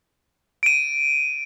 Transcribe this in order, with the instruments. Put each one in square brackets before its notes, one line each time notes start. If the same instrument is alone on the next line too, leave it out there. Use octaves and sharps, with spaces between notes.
[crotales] D7 D#7